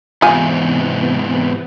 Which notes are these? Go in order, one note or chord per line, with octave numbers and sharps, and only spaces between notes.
E2 G#2 C3 E3 B3 F4 G4 G#5